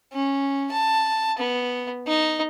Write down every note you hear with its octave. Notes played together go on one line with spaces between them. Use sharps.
C#4
A5
B3
D#4